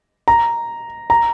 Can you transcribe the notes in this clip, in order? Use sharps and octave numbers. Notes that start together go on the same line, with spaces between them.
A#5
A#5